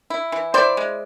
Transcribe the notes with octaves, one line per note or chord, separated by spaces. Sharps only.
E4
E3
E4 C5 D5
G#3